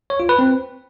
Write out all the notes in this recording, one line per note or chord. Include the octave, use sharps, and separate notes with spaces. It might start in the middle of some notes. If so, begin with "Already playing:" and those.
C#5
F4
B4
C4